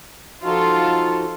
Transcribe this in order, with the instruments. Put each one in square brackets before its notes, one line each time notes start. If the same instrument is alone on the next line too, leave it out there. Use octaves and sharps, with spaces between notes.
[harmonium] F3 D#4 F#4 [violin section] F4 A4